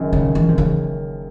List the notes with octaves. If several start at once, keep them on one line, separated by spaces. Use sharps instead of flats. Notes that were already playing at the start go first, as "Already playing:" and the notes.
Already playing: F#1 F#2 D#3
C#3
E3
C3
C#3